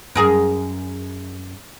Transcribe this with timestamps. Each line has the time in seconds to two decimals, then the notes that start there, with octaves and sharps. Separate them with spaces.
0.15 F#2 G#4 A#4